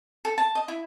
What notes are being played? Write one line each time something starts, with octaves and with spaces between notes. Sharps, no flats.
A4
A5
D#5
E4